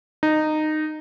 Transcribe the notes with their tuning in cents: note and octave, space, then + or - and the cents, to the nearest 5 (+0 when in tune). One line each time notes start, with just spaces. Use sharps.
D#4 -15